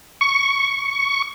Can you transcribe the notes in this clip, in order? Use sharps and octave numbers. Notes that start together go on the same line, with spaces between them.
C#6